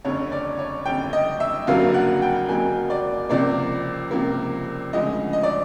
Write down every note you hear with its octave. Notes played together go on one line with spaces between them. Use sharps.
F#1 F2 D3 C#5
D5
C#5
F#1 F2 D3 G5
D#5
E5
F#1 F2 D3 F#3 A#3 F5
F#5
G5
F#1 F2 D3 F#3 A#3 G#5
D5
C#2 C3 F3 A#3 D5
C#2 C3 F3 A#3
D2 C#3 F3 G#3 D#5
D#5
D5